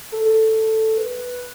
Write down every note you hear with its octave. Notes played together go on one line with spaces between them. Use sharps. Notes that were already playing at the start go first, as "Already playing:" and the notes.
A4
A4
B4